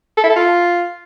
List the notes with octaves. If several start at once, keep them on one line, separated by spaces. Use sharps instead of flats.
A4
E4
A4
F4